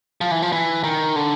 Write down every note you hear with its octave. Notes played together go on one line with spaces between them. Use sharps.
F3
E3
F3
E3
D#3
D3